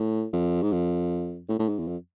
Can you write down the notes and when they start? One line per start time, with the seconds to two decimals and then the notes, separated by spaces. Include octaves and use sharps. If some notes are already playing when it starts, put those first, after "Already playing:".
Already playing: A2
0.33 F2
0.62 G#2
0.72 F2
1.49 A2
1.59 A2
1.69 G#2
1.79 E2
1.88 F2